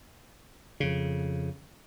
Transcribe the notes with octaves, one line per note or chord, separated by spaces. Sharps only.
F2 C#3